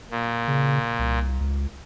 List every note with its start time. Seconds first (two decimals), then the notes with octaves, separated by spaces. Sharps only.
0.11 A#2
0.48 C#3
0.99 C2
1.40 C#2